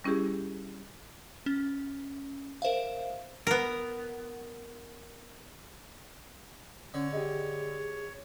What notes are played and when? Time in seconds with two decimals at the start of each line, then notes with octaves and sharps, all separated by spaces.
0.04 G3 C#4 E4 G4 G#4
1.46 C#4
2.62 A#4 C5 E5 F5
3.47 B3 A#4
6.94 D3 C#4 C#5
7.13 G4 G#4 D#5